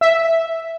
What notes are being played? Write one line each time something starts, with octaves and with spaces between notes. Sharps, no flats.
E5